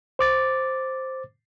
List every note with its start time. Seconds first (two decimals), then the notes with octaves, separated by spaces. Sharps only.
0.19 C5 D6 A6